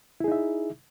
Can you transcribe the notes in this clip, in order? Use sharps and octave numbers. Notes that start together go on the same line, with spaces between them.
D#4 E4 G#4 E5